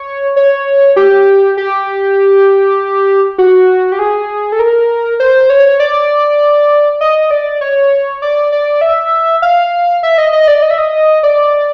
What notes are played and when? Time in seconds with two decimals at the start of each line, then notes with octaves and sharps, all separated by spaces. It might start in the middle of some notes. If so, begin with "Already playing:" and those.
Already playing: C#5
0.36 C#5
0.96 G4
1.57 G4
3.38 F#4
3.92 G4
3.99 G#4
4.52 A4
4.59 A#4
5.20 C5
5.50 C#5
5.80 D5
7.01 D#5
7.31 D5
7.61 C#5
8.22 D5
8.52 D5
8.81 E5
9.42 F5
10.03 E5
10.18 D#5
10.33 D#5
10.48 D5
10.62 D#5
10.70 E5
10.78 D#5
11.23 D5